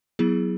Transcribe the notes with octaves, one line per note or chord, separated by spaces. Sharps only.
F#3 B3 E4 G#4